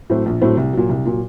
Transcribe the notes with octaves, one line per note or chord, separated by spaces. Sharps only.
A2 F#3 A3 C4
A#1
A2 F#3 A3 C4
C2
A#2 F#3
C2
A#2 F#3